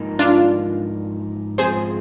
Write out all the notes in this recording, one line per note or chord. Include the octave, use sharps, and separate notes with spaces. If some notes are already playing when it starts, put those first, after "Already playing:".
Already playing: G#2 F3 A#3 D#4 A#4
D4 F4
G#2 F3 C4 G#4 C5